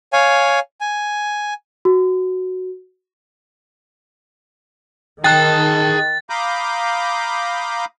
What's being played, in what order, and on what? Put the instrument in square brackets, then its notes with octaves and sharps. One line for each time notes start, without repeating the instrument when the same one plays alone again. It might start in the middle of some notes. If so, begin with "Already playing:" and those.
[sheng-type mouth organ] C#5 F5 G#5
G#5
[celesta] F#4
[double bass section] D#3 [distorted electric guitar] G#4 A5 [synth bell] G5 F#6 [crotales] A6
[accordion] F5 A#5 B5 D6 D#6 G6